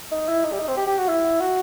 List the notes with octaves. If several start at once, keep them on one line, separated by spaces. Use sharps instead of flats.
D#4
E4
D#4
G3
D#4
C4
G4
G4
F#4
E4
F#4